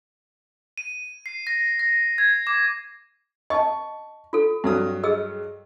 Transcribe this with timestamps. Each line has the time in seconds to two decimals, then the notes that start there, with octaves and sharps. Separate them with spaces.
0.78 D#7
1.26 C7
1.47 A#6
1.79 A#6
2.18 G#6
2.47 D6
3.50 D#5 A5 C#6
4.33 F4 A4
4.64 G2 F#3 D#6
5.04 G#4 D#5 E6